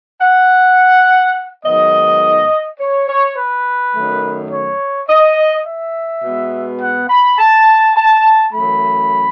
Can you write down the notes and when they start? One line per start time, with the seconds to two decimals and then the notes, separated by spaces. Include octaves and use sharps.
0.22 F#5
1.65 G#2 D#3 F#3 B3 D#5
2.80 C#5
3.08 C#5
3.37 B4
3.95 F#2 D#3 A3
4.52 C#5
5.09 D#5
5.67 E5
6.24 B2 G#3 B3
6.82 F#5
7.10 B5
7.39 A5
7.96 A5
8.53 F#2 E3 A3 B5